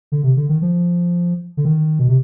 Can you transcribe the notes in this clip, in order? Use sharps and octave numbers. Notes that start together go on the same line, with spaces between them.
D3
C3
D3
D#3
F3
D3
D#3
B2
C3